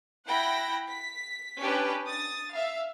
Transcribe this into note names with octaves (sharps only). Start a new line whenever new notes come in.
E4 F#5 G5 B5 A#6
B6
C#4 D4 G4 B4
D#6 A6
E5 F5